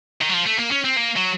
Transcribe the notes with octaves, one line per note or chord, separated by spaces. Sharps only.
D#3
F#3
F3
A3
A#3
C#4
C4
A#3
F#3